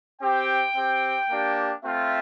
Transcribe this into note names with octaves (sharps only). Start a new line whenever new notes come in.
C4 G4 G5
C4 G4
A#3 D4 G4
A3 C4 F4 E5